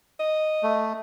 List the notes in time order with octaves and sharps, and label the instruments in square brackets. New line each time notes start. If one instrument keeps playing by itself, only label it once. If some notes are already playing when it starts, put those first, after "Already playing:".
[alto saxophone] D#5
[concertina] A3